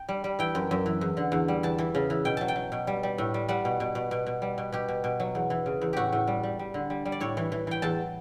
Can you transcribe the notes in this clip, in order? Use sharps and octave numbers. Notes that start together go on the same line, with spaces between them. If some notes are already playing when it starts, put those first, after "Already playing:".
Already playing: G5
G3
G3
E3 G5
F#2
F#2
E3
E2
D3
E2
G3
E2 A5
E3
C#3
E3
B2 G5
F#3 A5
G5
F#3
B2
G3
G3
A2
G3
G3 F#5
B2
B2
B2
B2
B2
G3
B2
B2 G4
B2
B2
F#3
E2
E3
C#3
E2
A2 F#4 G4
A2
G3
G3
G3
D3
G3
G3
D5
A2 C#5
E3
E3
E3 G5
E2 A5